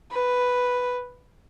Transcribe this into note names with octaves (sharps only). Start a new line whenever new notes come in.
B4